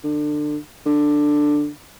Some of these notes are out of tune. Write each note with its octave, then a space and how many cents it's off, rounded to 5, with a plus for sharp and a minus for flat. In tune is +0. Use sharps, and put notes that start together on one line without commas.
D3 +25
D3 +10